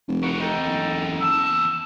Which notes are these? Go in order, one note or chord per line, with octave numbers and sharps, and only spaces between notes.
F1
C#3 E4 A#4 F#5 C#6
E2 D#4 A4 G5 A#5
F#1
E2 A5 E6